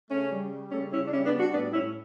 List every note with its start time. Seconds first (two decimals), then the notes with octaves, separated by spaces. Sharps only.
0.10 C#3 A3 C#4
0.31 G3
0.52 G3
0.72 C#3 A3 C#4
0.92 C#3 C#4 E4
1.07 D4
1.12 G3 C#4 E4
1.26 B3 D4
1.33 G3
1.39 D4 F#4
1.53 A2 B3 D4
1.73 A2 C#4 E4